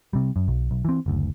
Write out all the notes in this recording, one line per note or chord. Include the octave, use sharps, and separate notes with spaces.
C3 G3
F#2
B1
B1
E3 C4
F#1 D2